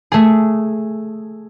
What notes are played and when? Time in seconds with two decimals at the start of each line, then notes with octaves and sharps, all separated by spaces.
0.12 A3 G#4